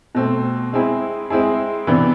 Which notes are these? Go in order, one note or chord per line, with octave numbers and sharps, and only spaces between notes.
B2 A3 C4
G#3 C4 E4 G#4
G#3 C4 E4 G#4
C3 E3 B3 D4